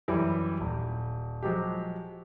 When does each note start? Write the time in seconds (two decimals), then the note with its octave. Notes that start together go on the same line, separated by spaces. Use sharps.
0.08 F#2 E3 G3 E4
0.60 D#1
1.43 F3 F#3 G#3 G4